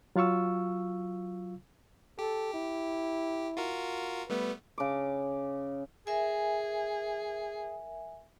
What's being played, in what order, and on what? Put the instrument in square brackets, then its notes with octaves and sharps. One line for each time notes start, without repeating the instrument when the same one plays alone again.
[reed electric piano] F#3 F4 F5 C#6 E6
[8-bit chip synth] G4 [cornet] A4
[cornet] E4
[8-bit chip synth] F4 F#4 A#4
[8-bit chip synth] G3 A3 B3 [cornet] B4
[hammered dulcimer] C#3 D6
[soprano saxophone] G#4 [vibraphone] A#4 E5 G#5